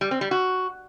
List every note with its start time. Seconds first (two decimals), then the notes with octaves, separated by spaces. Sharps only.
0.01 G3
0.11 C4
0.21 G3
0.31 F#4